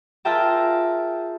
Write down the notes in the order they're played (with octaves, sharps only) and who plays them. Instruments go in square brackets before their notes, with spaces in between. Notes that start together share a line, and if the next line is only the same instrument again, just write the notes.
[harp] F4 G#4 A#4 E5 G5 A5